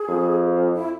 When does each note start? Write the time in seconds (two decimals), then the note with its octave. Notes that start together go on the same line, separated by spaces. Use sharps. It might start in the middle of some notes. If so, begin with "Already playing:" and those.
Already playing: G#4
0.08 F2
0.75 E4